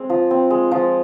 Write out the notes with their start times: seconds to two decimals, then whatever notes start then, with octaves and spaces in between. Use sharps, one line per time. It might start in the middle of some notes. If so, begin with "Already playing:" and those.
Already playing: G#3 C4
0.10 F3
0.31 C4
0.50 G#3
0.72 F3